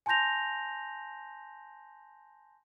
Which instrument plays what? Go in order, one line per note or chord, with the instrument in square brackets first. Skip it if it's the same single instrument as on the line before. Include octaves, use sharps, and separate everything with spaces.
[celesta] G#5 A5 C6 G6 A#6 F7